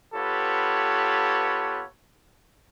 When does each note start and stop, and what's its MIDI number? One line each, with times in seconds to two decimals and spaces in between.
0.14 1.84 59
0.14 1.84 65
0.14 1.84 67
0.14 1.84 69
0.14 1.84 71
0.14 1.84 73